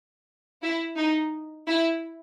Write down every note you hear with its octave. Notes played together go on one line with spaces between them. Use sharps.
E4
D#4
E4